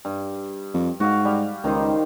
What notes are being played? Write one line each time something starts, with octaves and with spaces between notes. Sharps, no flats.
G2
F2
G#2 F#4 F5
G3
C#2 D#3 D#4 C5